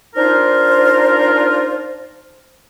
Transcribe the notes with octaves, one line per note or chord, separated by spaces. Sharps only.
D4 D#4 F4 A#4 C5